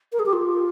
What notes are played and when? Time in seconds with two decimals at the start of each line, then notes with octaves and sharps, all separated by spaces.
0.12 A#4
0.19 G#4
0.26 G4
0.33 F4